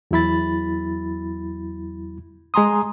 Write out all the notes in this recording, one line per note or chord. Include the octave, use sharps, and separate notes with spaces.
E2 F#3 E4 B5 A6
G#3 G#5 A#5 C6 D#6